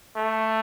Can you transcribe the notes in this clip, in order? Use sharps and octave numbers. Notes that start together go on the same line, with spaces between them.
A3